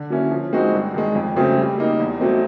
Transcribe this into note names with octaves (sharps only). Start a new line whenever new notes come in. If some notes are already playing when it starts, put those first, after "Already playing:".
Already playing: D3
F#3 A#3 C#4 E4
F3
G#3 C4 D#4 F#4
G2
D#3 G#3
F2
C#3 F#3 A3 C4
G3
A#3 D#4
E2
B2 F#3 A3 C4